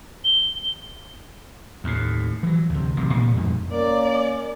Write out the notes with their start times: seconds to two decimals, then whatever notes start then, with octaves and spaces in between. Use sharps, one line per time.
0.24 G7
1.84 D#2 A2
2.43 E3 F#3
2.70 D2 C3
2.97 A1 C3 F#3
3.13 A#2 G3
3.34 F2 G#2 B2
3.72 A#3 C#4 D5